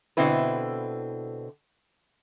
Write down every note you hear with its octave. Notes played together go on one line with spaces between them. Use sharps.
B2 D3 C4 E4 B4